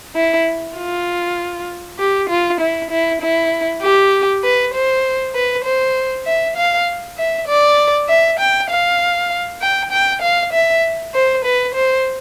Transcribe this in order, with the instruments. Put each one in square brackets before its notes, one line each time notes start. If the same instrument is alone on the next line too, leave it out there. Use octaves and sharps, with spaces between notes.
[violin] E4
F4
G4
F4
E4
E4
E4
G4
B4
C5
B4
C5
E5
F5
E5
D5
E5
G5
F5
G5
G5
F5
E5
C5
B4
C5